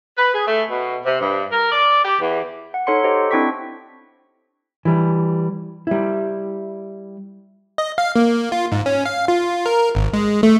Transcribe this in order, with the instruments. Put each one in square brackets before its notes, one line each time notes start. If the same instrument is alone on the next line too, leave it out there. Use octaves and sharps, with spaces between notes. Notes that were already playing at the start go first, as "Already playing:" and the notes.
[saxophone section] B4
G#4
A3
B2
C3
G2
A#4
D5
G4
E2
[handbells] F#5
D#4 A4 C#5 F#5 C6 C#7
G4 A4 C5 D#5
C4 D4 E4 G5 C#6 B6
[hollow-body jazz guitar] E3 G3
G3 E4
[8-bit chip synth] D#5
F5
A#3
F4
G#2
C#4
F5
F4
A#4
G#1
G#3
A3